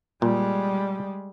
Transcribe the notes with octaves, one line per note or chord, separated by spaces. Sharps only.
A#2 G3 G#3